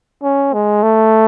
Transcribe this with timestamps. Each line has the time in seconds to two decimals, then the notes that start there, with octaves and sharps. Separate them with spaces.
0.23 C#4
0.53 G#3
0.83 A3